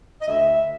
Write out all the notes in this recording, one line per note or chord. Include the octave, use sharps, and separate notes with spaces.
D#5
D2 E5